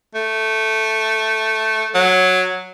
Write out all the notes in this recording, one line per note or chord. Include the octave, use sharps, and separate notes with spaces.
A3
F#3